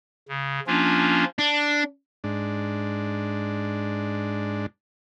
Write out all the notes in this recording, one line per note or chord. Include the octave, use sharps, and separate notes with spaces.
C#3
F3 A#3 C#4 D4 F4
D4
G#2 D4